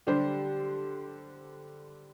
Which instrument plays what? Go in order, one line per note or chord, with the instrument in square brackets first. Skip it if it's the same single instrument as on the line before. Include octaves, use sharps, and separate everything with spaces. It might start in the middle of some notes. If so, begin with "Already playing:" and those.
[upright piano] D3 G3 D4 G4 C5